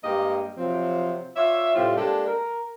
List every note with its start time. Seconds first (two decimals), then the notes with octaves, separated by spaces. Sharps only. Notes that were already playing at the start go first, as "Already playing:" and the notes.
0.04 G2 G#3 A#3 G4 D#5
0.57 C3 F3 F#3 C4
1.36 F4 C#5 D5 E5
1.75 A2 C3 G3 C4 F4
1.96 G#3 A#3 D4 G4 A4
2.27 A#4